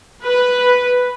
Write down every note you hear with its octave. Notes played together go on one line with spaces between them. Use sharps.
B4